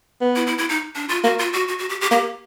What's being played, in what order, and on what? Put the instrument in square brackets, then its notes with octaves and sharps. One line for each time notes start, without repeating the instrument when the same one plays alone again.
[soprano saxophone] B3
[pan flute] E4
E4
E4
D#4
D4
F4
[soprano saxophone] A#3 [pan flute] F#4
[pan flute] F4
F#4
F#4
F#4
G4
G4
[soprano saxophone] A#3 [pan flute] G4